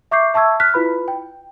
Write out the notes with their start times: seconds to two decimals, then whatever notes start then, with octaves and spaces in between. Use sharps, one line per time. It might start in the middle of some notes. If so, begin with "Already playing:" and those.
0.11 E5 C#6 D6 G6 C7
0.34 E5 A5 C#6 E6 G#6
0.60 F6 F#6 B6
0.74 E4 F4 B4 B5
1.08 G5